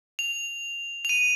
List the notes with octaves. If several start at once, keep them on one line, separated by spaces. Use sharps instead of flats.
F7
F7
D#7